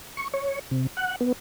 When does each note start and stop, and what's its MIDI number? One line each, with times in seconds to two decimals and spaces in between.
0.17 0.28 85
0.33 0.59 73
0.71 0.87 48
0.97 1.16 78
1.21 1.32 59